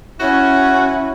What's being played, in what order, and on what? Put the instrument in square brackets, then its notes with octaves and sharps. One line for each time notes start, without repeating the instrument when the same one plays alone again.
[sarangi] C#4 [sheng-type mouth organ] E4 [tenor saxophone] F#4